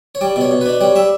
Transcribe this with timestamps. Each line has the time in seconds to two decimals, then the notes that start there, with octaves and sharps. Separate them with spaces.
0.15 C#5
0.21 G3 D5
0.36 B2 C#5 D5
0.51 B2
0.61 D4 B4
0.81 G3 C#5
0.95 G3 E5